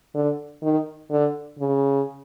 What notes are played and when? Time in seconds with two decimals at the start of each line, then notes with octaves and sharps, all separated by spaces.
0.15 D3
0.63 D#3
1.10 D3
1.59 C#3